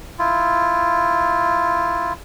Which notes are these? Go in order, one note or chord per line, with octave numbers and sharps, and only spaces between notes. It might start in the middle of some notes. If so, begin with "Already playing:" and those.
E4 F4